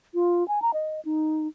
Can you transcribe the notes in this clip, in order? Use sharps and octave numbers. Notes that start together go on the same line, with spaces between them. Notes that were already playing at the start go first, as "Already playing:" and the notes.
F4
G#5
A#5
D#5
D#4